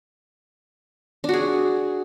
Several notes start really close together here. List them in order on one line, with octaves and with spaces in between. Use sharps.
D4 F#4 G#4